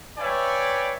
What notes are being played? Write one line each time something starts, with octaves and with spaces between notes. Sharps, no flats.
B4 C#5 D5 E5 G5 G#5